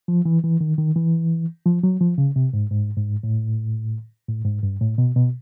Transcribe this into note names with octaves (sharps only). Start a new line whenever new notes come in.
F3
E3
E3
D#3
D#3
E3
F3
F#3
F3
C#3
C3
G#2
G#2
G#2
A2
A2
G#2
G2
A2
B2
B2